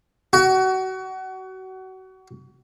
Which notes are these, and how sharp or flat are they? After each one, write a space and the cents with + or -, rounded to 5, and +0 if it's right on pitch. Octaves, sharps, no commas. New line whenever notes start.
F#4 +30